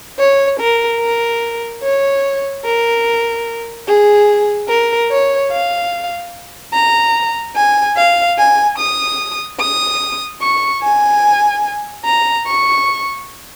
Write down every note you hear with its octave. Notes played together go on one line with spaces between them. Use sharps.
C#5
A#4
A#4
C#5
A#4
G#4
A#4
C#5
F5
A#5
G#5
F5
G#5
D#6
D#6
C#6
G#5
A#5
C#6